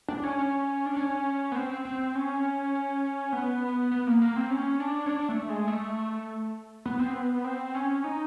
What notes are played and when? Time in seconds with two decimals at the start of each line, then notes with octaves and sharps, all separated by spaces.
0.09 D4
0.23 C#4
0.39 C#4
0.86 D4
0.97 C#4
1.52 B3
1.55 C4
1.85 C4
2.15 C#4
3.33 B3
3.92 B3
4.07 A#3
4.22 A#3
4.36 C4
4.50 C#4
4.80 D4
5.06 C#4
5.09 D4
5.29 A3
5.49 G#3
5.68 A3
6.86 B3
6.99 C4
7.13 B3
7.45 C4
7.75 C#4
8.04 D#4